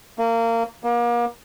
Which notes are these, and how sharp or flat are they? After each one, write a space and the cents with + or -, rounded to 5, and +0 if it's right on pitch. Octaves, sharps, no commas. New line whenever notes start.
A#3 -25
A#3 +35